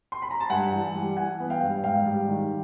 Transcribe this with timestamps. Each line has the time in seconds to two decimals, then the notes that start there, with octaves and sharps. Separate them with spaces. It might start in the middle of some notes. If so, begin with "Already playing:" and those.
0.12 C6
0.22 B5
0.31 A#5
0.40 A5
0.50 G2 F#5 G#5
0.72 E3
0.95 G3
1.16 E3 F#5 G#5
1.40 B3
1.50 F5 G5
1.61 G2
1.84 G#2 F5 G5
2.06 G3
2.28 D#3